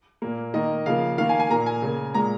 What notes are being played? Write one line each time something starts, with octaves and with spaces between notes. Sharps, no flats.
A#2 A#3
D#3 A#3 D#5
C#3 F3 A#3 F5
D#3 A#3 F5
G#5
G#5
A#2 A#3 A#5
G#5
C#3 A#3
A#2 G#3 A#5